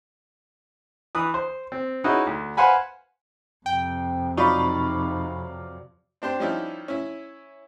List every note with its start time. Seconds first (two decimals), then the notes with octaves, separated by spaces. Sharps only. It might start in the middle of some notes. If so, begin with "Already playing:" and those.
1.15 E3 B4 D#6
1.34 C5
1.72 C4
2.04 C#4 D#4 E4 F#4 G#4 B4
2.27 D2
2.57 B4 C5 F5 F#5 G#5 B5
3.66 F2 C3 G5
4.37 F#3 D#4 F4 D5 B5 C#6
6.22 C4 D4 G4 C5
6.40 F3 G3 C#4 D#4 E4 G4
6.88 C#4 E4